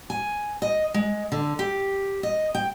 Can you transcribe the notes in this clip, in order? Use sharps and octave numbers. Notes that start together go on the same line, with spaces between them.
G#5
D#5
G#3
D3
G4
D#5
G5